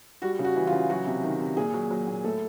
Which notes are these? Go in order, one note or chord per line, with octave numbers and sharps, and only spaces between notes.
G3 F#4
C#3
F#4
E3
F4
C#3
F#3 F#4
C3
D#3
C3
A#2 G#4
F#3
F#3
A#2
A2 A4